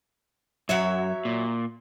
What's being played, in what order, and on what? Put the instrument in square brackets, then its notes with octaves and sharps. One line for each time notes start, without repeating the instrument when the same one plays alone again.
[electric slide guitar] F#2 [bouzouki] F#3 C#5 E5
[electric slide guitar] A#2